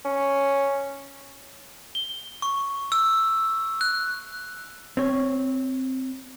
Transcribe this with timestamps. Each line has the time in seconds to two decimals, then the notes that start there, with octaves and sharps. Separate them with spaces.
0.05 C#4
1.95 G7
2.42 C#6
2.92 E6
3.81 F#6
4.97 C4 C#5